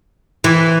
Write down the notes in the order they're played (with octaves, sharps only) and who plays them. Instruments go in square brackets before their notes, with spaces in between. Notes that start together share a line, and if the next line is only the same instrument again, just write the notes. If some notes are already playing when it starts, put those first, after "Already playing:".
[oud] E3